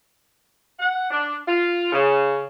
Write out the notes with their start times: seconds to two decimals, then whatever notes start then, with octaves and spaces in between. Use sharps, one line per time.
0.80 F#5
1.11 D4
1.47 F4
1.92 C#3